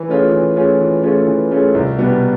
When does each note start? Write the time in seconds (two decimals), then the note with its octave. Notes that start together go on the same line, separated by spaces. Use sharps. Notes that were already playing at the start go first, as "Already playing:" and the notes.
Already playing: E3
0.08 A3 C#4 F4 G#4
0.32 E3
0.55 A3 C#4 F4 G#4
0.80 E3
1.03 A3 C#4 F4 G#4
1.28 E3
1.51 A3 C#4 F4 G#4
1.74 C2
1.98 B2 G3 B3 D4